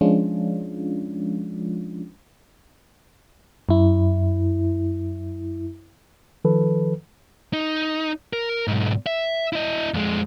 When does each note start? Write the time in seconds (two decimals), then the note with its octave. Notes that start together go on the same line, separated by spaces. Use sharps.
0.01 F3 G#3 C#4 D4 F4
3.69 F#2 E4
6.45 D#3 F3 A4 B4
7.53 D#4
8.33 A#4
8.67 B1 G#2
9.07 E5
9.53 E4 D#5
9.94 F2 G#3